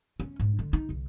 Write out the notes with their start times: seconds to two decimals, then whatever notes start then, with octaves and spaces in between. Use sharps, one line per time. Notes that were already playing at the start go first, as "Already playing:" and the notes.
0.20 C#4
0.40 G#2
0.59 D3
0.73 D#4
0.89 C2